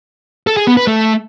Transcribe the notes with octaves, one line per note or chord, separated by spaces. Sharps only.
A4
G#4
B3
B4
A3